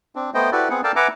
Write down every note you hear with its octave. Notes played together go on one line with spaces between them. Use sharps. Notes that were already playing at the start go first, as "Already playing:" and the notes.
C4 D4
A3 B3 C5 D#5 G5
E4 F#4 G4 A4 B4 D5
B3 C4 G#4 F#5
A4 A#4 D5 F5 G5 A5
B4 E5 F#5 G#5 A#5 D6